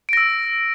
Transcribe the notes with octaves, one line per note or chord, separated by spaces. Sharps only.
E6 A#6 D7